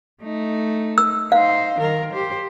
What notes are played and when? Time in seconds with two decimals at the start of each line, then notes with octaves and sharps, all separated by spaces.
0.23 A3 D#4
0.98 E6
1.32 D#4 C5 F5
1.79 D#3 A#4
2.13 G4 C5